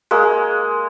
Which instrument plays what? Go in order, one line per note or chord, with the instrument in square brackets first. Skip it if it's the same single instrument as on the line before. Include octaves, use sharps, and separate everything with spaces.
[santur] G#3 A#3